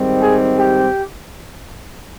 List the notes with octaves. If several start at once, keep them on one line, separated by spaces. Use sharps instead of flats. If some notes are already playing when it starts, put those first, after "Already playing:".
Already playing: G#2 D#3 G3 C4
G#4
G4